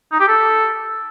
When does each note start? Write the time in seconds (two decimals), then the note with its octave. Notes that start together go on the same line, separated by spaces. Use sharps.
0.12 D#4
0.20 G4
0.28 A4